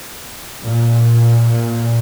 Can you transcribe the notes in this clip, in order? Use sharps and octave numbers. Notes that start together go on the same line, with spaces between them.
A#2